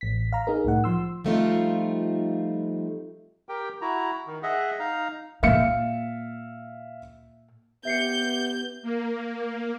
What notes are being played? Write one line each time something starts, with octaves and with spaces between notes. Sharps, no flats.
A1 B6
F5 A#5
D#4 G#4 A#4
C2 A2 F#5
F3 C6 E6
F3 G3 A3 C4 D#4 F4
G4 A#4 G5
E4 F#4 A#5
D#3
G#4 D#5 E5 F#5
D#4 F5 A#5
A#2 A#3 E5 F5 C#7
B3 G4 E5 G6 C7 C#7
A#3